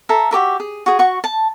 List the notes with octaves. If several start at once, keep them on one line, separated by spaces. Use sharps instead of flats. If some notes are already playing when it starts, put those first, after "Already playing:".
A4 E5 A#5
F#4 G4 A#4 E5
G#4
F#4 G#4
F#4 F#5 C#6
A5